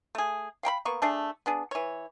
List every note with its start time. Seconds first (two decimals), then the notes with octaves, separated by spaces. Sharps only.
0.15 A3 G#4
0.63 F5 G5 A#5 B5
0.85 A#3 B3 C#6
1.02 A3 D4 G#4
1.46 B3 D4 G#4
1.71 E3 C#5